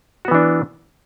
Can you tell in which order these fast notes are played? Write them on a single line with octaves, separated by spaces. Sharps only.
F#4 B3 E3 D4